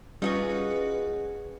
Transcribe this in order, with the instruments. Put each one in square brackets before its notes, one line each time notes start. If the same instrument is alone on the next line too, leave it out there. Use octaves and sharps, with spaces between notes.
[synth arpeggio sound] G3 [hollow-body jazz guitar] C#4 F4 [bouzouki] D#4 F#4 G#4 [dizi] B4